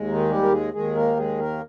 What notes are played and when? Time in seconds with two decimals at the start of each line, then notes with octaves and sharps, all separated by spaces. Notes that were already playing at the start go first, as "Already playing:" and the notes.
Already playing: D#2 G#3
0.08 D#3 D#4
0.30 G3 G4
0.42 A#4
0.52 G#3 G#4
0.73 D#2 D#3 G#3 G#4
0.95 A#3 A#4
1.17 G#3 G#4
1.39 A#3 A#4